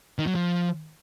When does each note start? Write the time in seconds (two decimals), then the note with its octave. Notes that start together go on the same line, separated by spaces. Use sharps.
0.19 D#3
0.27 F#3
0.35 F3